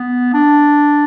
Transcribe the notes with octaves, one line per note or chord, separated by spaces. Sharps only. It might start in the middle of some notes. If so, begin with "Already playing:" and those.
Already playing: B3
D4